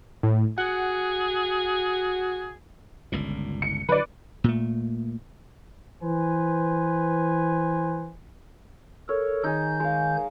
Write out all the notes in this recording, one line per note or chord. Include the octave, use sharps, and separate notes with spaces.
A2
F#4 G#4 F#5
G1 C#2 A#2
C#7
D3 F#3 B4 D5
A#2 A3
E3 B4 C5 G#5
A4 A#4 C#5
D#3 D#4 G#4 G6
G#3 F5